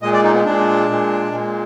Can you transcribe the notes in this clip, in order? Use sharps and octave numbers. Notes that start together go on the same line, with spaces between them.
A#2 G#3 D#5
D5
D#4
B3
A#2 G#3 D4
A#2 G#3
A#2 G#3